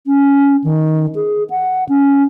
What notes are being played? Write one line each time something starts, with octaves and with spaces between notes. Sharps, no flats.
C#4
D#3
G#4
F#5
C#4